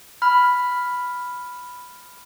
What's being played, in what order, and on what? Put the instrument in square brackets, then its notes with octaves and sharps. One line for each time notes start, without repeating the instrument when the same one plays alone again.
[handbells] B5 F6